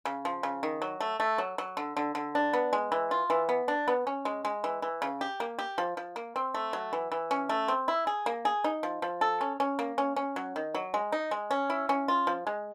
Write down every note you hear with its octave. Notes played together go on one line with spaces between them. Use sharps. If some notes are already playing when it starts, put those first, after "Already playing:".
C#3
F3
C#3
D#3
F#3
A3
A3
F#3
F#3
D3
D3
D3
D4
B3
G#3
E3
F4
E3
B3
D4
B3
C#4
G#3
G#3
E3
E3
C#3
G4
A#3
G4
F3
F3
A#3
C4
A3
F#3
E3
E3
C#4
A3
C4
E4
G#4
A#3
G#4
D#4
F3
F3
A4
C#4
C#4
A#3
C#4
C#4
F#3
D#3
F#3
G#3
D#4
G#3
C#4
E4
C#4
F4
F3
G#3